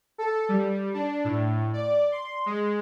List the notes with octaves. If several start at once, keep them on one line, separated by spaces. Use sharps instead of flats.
A4
G3
D4
A2
D5
C6
G#3